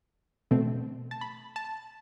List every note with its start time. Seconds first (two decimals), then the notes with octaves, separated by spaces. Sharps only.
0.51 B2 A3 C4
1.11 A5
1.21 B5
1.56 A5